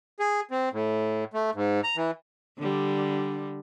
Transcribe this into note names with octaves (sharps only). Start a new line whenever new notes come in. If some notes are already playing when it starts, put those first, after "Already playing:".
G#4
C4
A2
A3
G#2
A#5
E3
D3 G3